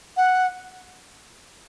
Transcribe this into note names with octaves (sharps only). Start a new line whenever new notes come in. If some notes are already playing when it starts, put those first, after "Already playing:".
F#5